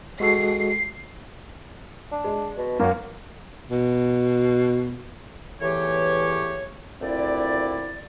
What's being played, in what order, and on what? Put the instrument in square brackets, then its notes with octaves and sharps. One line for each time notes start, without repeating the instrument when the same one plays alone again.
[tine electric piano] G#3 F#4 A4 [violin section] C7
[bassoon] D4
[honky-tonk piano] G#3
[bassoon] B2
[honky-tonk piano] F#2 C#5 F#5 [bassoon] A#3
[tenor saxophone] B2
[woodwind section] E2 A2 E3 G4 C#5
D2 A#2 C4 E4 D5